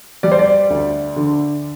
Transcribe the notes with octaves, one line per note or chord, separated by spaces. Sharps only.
G3 D5
C5
D5
D2
D3